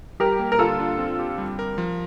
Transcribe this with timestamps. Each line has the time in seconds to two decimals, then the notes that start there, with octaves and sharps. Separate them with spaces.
0.20 G3 G4 A#4
0.39 A#3
0.52 A#4
0.59 D3 F4 A4
0.80 D4
0.98 C4
1.19 G4
1.38 G3
1.59 A#4
1.78 F3